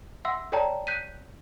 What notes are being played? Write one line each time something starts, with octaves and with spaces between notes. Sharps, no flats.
E5 F#5 C6 E6
A4 C#5 D5 G5 A5 A#5
F#6 G6 B6 D#7